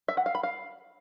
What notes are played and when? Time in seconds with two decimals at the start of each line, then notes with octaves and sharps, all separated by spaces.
0.08 E5
0.17 F#5
0.26 F5
0.35 B5
0.43 F5